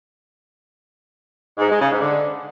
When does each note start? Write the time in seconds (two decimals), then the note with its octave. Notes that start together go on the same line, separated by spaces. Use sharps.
1.58 G#2
1.69 G#3
1.80 C#3
1.90 G#2
2.01 D3